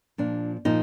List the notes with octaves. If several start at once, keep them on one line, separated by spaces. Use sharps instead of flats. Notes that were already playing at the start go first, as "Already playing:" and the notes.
A#2 F3 D4
A#2 F3 D#4